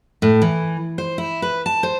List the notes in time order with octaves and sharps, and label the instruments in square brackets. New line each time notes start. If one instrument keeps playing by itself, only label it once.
[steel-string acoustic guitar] A2
E3
C5
E4
B4
A5
C5